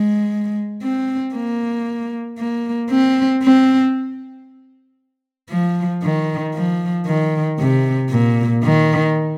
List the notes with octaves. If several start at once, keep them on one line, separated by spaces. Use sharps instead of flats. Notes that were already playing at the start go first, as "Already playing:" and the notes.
Already playing: G#3
C4
A#3
A#3
C4
C4
F3
D#3
F3
D#3
C3
A#2
D#3